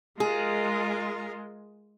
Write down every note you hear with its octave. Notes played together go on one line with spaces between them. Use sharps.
G#3 F4 G#4 A#4